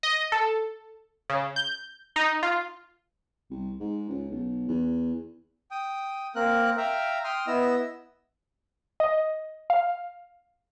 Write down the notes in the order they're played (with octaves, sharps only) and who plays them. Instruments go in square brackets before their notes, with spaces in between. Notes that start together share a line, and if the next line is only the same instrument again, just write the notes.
[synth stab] D#5
A4
C#3
G6
D#4
F4
[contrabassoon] C2
G#2
C#2
B1
E2
[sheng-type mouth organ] G5 D#6
A#3 C4 A#4 F#6
E5 F5 G5 A#5
G5 C6 D#6 F6
B3 E4 D#5 E6
[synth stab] D#5
F5